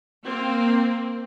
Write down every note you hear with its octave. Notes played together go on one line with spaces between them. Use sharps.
A#3 C4